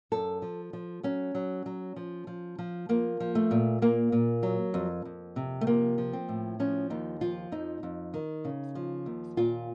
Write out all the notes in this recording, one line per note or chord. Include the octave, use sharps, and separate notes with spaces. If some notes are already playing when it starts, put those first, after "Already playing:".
F#2 A4
F3
F3
F#3 C#4
F#3
F#3
F3
F3
F3
F3 A#3
F3
A3
A#2
A#2 A#3
A#2
F#3
F2
F2
C3
A3
F3 A#3
F3
C4
A2
F3 C#4
D#2 D#4
F3 F4
F2 D#4
F2
D#3
C#3
F3
D#2
A#2 F4